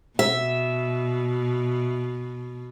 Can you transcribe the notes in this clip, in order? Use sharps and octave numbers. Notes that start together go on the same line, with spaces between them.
B2 E5